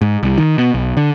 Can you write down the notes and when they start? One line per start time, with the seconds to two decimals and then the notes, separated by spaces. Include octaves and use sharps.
0.01 G#2
0.23 C2
0.38 D#3
0.58 B2
0.74 B1
0.97 D3